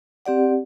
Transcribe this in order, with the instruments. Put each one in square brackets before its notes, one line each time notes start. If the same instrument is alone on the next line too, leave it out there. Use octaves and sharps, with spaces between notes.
[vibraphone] C4 G4 D5 F#5